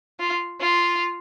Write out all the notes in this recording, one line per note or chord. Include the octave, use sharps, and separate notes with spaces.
F4
F4